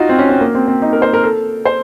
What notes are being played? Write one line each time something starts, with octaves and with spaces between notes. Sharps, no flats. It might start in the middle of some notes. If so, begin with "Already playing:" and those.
Already playing: D#4 F4 F#4
C4
C#4
C4
A#3
C4
C4
D#4
A#4
C5
A#4
A4
C5